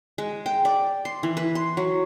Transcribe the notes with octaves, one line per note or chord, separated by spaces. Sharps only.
G#3
G5
D5
C6
E3
B4
C6
F#3